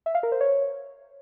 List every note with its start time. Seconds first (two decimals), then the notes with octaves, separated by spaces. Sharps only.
0.06 E5
0.15 F5
0.23 A#4
0.32 C5
0.41 C#5